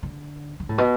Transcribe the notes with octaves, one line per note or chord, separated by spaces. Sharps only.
D3
D3
A2
B2